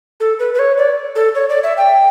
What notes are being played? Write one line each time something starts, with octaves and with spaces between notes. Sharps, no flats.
A4
B4
B4
C#5
D5
A4
C#5
D5
E5
G5